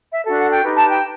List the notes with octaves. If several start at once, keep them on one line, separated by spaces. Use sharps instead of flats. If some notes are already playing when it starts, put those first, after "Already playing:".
E5
D4 F#4 A4
F#5
G5
D#4 G4 B4
A5
G5